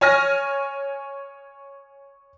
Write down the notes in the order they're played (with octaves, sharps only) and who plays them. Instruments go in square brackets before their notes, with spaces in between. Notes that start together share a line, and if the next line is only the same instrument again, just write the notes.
[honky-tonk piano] C#5 G#5 F6 A#6